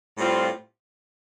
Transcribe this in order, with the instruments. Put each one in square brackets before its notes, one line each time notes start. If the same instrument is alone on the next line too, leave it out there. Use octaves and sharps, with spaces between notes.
[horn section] A2 G3 C4 F4